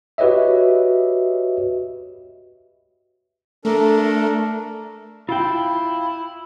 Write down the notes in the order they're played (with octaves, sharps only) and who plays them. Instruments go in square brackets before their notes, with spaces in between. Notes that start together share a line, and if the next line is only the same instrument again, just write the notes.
[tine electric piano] F#4 G4 B4 C#5 D#5 E5
[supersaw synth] A3 [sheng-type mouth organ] D4 A4 A#4
[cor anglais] E4 [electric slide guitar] F4 F5 G5